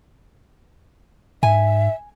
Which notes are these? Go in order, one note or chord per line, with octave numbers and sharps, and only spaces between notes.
G#2 E5 G#5